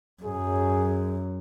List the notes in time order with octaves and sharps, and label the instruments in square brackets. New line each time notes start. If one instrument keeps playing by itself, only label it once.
[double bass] F#2 [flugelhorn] G#4